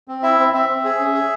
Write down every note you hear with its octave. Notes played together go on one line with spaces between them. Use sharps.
C4
E4 E5
C4
C4 E5
C4
G#4
C#4
G#4